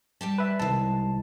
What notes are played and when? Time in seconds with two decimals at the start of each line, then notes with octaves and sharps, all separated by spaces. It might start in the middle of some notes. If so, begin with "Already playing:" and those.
0.21 G3 G4 A5
0.38 B4 E5
0.59 C2 D#3 G#3 A5